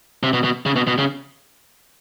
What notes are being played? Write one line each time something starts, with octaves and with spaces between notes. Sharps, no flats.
C3
B2
B2
C#3
B2
B2
C#3